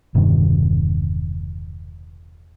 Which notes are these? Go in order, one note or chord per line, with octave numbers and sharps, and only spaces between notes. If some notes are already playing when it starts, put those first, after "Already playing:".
E1 G2 C3 D#3